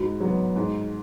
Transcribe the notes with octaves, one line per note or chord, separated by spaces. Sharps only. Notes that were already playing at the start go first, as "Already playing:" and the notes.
Already playing: G#2 F#4
F#3 B3
G#2